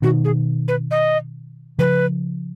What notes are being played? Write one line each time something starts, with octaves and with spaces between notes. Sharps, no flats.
B2 D#3 F#4
G#4
B4
D#5
C#3 F3 B4